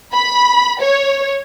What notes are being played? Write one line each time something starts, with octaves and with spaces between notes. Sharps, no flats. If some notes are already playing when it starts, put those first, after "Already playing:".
B5
C#5